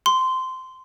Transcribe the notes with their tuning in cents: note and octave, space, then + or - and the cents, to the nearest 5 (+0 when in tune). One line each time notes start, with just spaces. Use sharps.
C6 -15